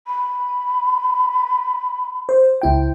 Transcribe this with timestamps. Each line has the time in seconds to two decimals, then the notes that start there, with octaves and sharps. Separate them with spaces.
0.07 B5
2.29 C5
2.62 C#2 E4 G5